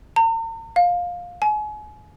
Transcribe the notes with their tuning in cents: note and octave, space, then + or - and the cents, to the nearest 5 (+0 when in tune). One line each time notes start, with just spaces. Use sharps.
A#5 -45
F5 +15
G#5 +35